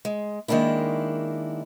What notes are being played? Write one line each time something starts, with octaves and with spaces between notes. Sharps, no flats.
G#3
D#3 G#3 A#3 D4 E4